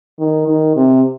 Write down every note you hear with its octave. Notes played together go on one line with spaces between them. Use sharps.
D#3
D#3
C3